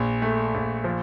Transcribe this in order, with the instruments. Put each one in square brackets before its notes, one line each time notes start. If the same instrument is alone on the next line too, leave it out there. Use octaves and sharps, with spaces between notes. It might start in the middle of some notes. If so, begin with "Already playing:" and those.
Already playing: [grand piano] A#1
A3
A#1
F3